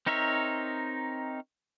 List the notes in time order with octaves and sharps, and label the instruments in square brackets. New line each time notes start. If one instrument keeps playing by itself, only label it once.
[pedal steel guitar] C4 D#4 A#4 C#5 E5